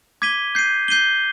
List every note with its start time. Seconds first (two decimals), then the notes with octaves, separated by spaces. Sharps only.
0.22 D6 G#6 B6 D#7 G7
0.55 G6 C7 D#7
0.88 G6 C7 D#7 G7